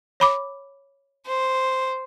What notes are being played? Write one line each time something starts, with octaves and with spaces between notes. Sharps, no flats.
C#5 B5 D6
C5